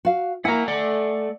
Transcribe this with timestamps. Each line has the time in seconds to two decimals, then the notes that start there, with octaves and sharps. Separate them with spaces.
0.05 F#4 F5
0.45 A#3 E4 F#5 G#5 A#5
0.68 A3 D5 F#5